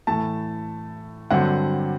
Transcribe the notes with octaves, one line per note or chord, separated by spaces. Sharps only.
A2 E3 A3 A5
G2 D3 F#3 C4 F#5